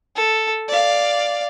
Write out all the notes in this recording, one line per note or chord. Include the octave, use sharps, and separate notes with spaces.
A4
D5 F5